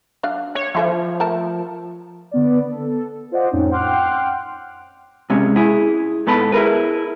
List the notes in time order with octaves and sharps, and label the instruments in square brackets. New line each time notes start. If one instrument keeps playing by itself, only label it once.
[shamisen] F#3 D4 F5
[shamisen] D4 [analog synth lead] C#5
[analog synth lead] F3 [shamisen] E4 A4 E5
[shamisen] A3 A#4 A5
[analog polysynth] D3 B3 D5
A4
F4 C5 D5 D#5 F#5
F2 A2 C4 C#4 D#4
F#5 G5 C6 D6 F6 F#6
[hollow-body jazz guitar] C3 G#3 C#4
E4 G#4
G#2 B3 A4 B5
E4 G#4 A#4 B4